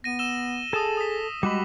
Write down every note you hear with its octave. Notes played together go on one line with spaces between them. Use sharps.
B3 A#6 D#7
E6 E7 G7
G#4 A4 A5 D#6 E6
D#6 B6
G3 G#3 F#4 B5 D6